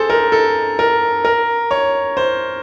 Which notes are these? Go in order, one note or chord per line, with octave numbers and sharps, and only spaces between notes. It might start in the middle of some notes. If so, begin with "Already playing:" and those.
Already playing: G#4 A4 C5
A#4
A4
A#4
A#4
C#5
C5